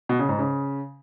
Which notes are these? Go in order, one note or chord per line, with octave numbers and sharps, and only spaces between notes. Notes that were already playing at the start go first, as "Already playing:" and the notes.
B2
C#3
G#2
C#3